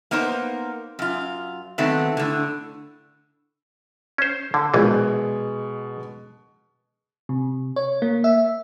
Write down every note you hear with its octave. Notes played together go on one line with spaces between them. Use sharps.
A#3 B3 D#4 A#4 C5
F#2 F4
D#3 F#3 A3 B3 C4
A2 D3
C#4 C5
D3
A#1 B2 E3 G#3
C3
C#5
A#3
E5